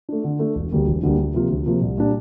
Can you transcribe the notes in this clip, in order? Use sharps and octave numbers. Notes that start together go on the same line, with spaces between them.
A3 D4
D3
A3 D4
E1
D2 D3 G3 A#3
E1
D2 D3 G3 A#3
D2
C3 F3 A#3 F4
D2
C3 F3 A#3 F4
C2
A#2 G3 D4